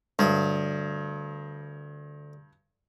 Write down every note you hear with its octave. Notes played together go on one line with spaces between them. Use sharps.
D2 G2 C#5